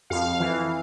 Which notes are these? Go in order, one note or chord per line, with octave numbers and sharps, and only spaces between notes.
F2 F5
E3